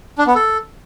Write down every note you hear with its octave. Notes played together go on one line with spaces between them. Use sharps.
D4
B3
A4